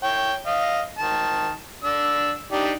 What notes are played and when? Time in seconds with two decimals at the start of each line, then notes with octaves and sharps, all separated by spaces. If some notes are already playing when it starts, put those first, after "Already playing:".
0.03 C#5 G5
0.47 D#5 F5
0.99 D#3 A5
1.84 D4 E6
2.52 D4 D#4 G4